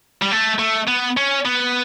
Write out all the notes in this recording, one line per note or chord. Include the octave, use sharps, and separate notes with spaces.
G3
A3
A3
B3
C#4
B3